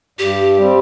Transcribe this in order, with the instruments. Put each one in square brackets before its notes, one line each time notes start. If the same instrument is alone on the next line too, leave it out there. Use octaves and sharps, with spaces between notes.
[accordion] G2 [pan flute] G4
[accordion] G3 C4